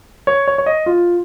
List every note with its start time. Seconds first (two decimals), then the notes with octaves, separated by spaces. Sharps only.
0.27 C#5
0.48 C#5
0.58 C#5
0.66 D#5
0.86 F4